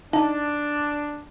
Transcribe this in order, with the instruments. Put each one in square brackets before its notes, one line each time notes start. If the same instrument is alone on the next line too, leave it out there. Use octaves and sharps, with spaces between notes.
[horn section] D4 [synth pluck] D#4 [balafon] A5